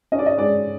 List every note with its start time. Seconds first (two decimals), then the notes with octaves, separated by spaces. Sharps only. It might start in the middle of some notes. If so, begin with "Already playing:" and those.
0.12 C#4 D#5
0.19 D5
0.26 D#5
0.38 G#3 D5